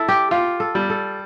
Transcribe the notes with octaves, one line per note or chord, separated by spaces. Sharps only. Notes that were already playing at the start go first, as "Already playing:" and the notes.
Already playing: E4 A4
G4
F4 G4
A4
G3
A4